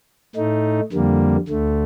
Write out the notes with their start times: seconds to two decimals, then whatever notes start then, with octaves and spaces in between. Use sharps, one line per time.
0.36 A2 A3 D#4
0.92 F2 D3 G3 A#3
1.48 D2 D3 A3